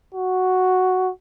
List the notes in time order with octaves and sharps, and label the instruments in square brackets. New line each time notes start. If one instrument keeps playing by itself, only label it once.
[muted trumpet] F#4